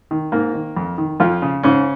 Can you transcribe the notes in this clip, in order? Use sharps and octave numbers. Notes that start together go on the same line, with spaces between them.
D#3
G#2 A#3 A#4
D#3
F2
D#3
F2 F3 F4
C#3
G#2 C#3 C#4